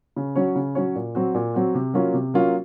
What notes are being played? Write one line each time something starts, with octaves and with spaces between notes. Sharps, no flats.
C#3
F#3 C#4 F#4 C#5
C#3
F#3 C#4 F#4 C#5
A#2
F#3 C4 F#4
A#2
F#3 C4 F#4
C3
F#3 A#3 C#4 F4
C3
F#3 A#3 C#4 F4